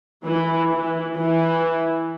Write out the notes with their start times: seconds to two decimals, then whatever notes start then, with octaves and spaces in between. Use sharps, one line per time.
0.24 E3
0.70 E3
1.15 E3